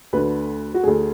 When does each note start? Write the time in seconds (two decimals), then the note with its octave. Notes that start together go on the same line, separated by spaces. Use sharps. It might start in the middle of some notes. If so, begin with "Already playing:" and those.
0.13 D2 D3 A3 B4
0.74 F#4
0.83 D2 D3 A3 G#4